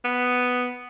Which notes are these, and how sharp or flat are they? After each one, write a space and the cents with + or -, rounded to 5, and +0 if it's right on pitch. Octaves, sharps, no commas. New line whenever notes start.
B3 +5